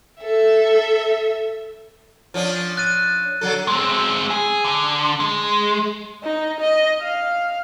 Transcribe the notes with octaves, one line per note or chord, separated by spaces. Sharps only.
A4 E5
F3 C#4 D4
F#6 A6 D#7
D3 F#3 A4
G#3 C4
G#4
D3
G#3
D#4
D#5
F5